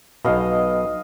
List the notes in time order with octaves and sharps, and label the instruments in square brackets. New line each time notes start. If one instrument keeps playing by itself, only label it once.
[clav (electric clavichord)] B1 B2 [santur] D#5 F5